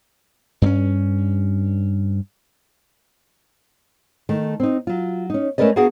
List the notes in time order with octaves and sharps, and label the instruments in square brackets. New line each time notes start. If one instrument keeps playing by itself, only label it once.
[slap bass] G2 C4 C#4
[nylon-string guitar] D#3 A3
C4 D#4
F#3 F4
C#4 D#4
A3 C#4 A#4 B4 D5 D#5
A#3 B3 D4 F#4 G#4 F#5